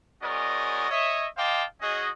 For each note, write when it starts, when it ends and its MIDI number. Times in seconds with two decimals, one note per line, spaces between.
0.22 0.89 56
0.22 0.89 61
0.22 0.89 66
0.22 0.89 70
0.22 0.89 74
0.22 0.89 75
0.90 1.26 73
0.90 1.26 75
0.90 1.26 76
1.37 1.64 72
1.37 1.64 75
1.37 1.64 77
1.37 1.64 79
1.37 1.64 81
1.37 1.64 86
1.81 2.08 61
1.81 2.08 66
1.81 2.08 68
1.81 2.08 75